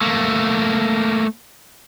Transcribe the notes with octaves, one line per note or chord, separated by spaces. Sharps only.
A3 A#3